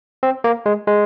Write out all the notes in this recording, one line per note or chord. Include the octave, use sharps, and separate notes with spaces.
C4
A#3
G#3
G#3